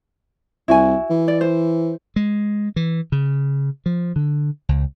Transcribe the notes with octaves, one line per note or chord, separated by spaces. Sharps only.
C2 E4 F#4 G#5
E3
D5
C5
G#3
E3
C#3
F3
D3
C#2